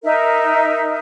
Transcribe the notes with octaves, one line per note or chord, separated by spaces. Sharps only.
D#4 A#4 E5